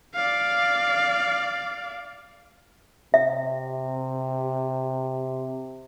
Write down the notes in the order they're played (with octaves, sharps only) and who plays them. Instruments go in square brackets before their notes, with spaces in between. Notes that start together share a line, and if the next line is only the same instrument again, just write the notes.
[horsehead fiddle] D5 F5
[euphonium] C3 [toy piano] E5